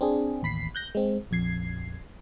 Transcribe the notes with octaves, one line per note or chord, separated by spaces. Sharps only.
C4 D4 G#4
A1 D#2 B5 B6 C7
F#6 G6 A#6
G#3 C4
A#1 F2 G#6 C7